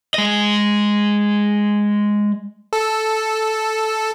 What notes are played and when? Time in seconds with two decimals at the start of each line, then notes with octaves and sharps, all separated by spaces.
0.14 G#3 D#5
2.73 A4